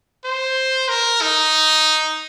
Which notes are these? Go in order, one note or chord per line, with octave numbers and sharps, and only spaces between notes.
C5
A#4
D#4